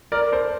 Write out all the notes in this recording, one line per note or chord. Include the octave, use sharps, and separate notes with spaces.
A#4 D5
A4 C5